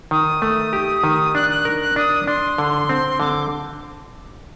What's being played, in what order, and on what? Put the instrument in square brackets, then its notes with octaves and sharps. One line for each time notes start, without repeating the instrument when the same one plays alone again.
[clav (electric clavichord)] D#3 [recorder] D#6
[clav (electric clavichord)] A3
G4
D#3
[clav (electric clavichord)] D4 [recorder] F#6
[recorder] F#6
[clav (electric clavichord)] A#4
[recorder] F#6
[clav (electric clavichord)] D4 [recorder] D#6
[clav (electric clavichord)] D4 [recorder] C6
[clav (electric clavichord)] D3
C4
[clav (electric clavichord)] D3 [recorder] D6